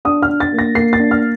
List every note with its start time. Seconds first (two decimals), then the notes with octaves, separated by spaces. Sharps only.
0.05 D4 D#6
0.22 F6
0.29 D4
0.40 A6
0.53 A#3
0.59 A#6
0.75 A#3 C7
0.93 A6
0.99 D4
1.11 F6